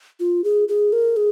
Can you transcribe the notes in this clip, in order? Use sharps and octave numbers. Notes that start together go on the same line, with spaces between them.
F4
G#4
G#4
A#4
G#4